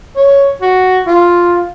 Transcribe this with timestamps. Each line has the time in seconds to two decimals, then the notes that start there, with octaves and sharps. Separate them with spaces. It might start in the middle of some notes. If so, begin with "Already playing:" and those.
0.16 C#5
0.61 F#4
1.07 F4